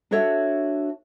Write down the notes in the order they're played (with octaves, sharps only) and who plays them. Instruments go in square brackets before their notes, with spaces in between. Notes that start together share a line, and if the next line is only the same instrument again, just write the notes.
[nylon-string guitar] D4 F#4 A4 C#5 E5